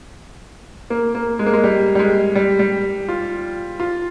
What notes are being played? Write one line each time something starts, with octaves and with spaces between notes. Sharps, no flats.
A#3
A#3
G#3
A#3
G#3
G3
G3
G#3
G3
G3
F4
F4